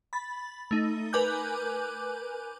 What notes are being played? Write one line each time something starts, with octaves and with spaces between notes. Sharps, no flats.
B5 A6
A3 D#4
A#4 B4 G#5 D6 F#6 G6